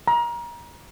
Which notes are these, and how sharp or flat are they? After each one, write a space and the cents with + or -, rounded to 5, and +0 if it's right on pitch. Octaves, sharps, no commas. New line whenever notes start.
A#5 +30